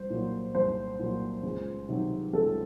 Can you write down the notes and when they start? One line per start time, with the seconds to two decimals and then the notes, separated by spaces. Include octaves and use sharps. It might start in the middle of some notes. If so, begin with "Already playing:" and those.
Already playing: C2 C5
0.10 A#2 F#3
0.55 C2 C5
0.99 A#2 F#3
1.43 C#2
1.89 C3 D#3 F#3
2.33 C#2 A4